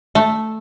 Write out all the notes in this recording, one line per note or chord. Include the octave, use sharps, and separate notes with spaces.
A3